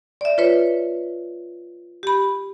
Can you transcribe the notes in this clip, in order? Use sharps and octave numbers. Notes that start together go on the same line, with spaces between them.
D5 E5
F4 B4 C#5
G4 B5